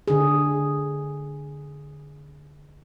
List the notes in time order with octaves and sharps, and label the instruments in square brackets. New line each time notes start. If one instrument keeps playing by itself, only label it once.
[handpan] D3 G#4